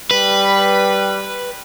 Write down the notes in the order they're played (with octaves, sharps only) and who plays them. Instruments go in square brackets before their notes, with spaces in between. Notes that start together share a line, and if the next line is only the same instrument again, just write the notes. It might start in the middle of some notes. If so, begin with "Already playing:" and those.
[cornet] G3 [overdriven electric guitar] B4